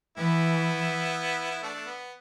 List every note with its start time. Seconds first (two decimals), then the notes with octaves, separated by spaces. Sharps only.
0.17 E3 B3 E4
1.51 E4
1.62 A3 D4
1.75 A3
1.87 B3